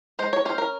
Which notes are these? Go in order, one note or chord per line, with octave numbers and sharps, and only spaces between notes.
G#3 C5
C#5
C#4 C5
A#4